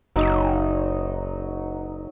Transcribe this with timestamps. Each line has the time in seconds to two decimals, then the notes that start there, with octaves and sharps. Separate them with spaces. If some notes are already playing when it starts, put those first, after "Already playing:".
0.16 F#1 F#3 D#4 D#5